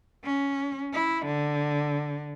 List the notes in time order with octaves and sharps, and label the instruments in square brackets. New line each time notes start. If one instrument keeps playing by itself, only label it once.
[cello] C#4
E4
D3